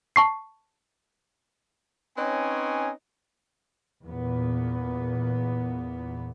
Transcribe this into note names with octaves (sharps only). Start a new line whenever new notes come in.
A5 C#6 C7
C4 C#4 D#4 B4 C#5 G#5
E2 A#2 B3